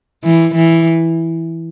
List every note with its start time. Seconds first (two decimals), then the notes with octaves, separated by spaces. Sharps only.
0.24 E3
0.55 E3